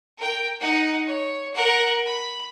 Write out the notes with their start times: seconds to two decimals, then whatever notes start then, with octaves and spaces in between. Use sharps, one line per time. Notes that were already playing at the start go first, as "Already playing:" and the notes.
0.18 A#4 G5
0.60 D#4 F#5
1.06 C#5
1.54 A#4 F#5
2.06 B5